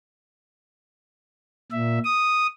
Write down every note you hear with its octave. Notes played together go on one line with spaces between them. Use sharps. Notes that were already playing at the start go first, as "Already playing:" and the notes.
A#2 E5
D#6